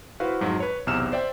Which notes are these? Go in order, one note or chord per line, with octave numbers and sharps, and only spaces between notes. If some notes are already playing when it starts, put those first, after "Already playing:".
E4 F#4 B4 C5 F5
F2 G#2 F#3
B4 C#5
B1 E2 C3 E6 F6 E7
C5 D5 E5 G5